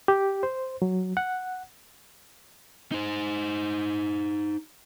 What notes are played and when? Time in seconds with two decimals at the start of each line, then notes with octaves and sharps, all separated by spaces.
0.08 G4
0.43 C5
0.82 F#3
1.17 F#5
2.92 D#4 C5